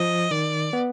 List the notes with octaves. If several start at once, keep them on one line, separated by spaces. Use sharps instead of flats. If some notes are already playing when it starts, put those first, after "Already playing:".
Already playing: F3 D#5
D#3 D5
B3